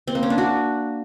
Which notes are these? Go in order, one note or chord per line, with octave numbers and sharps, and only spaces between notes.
C4
A#3
C#4
D4
F#4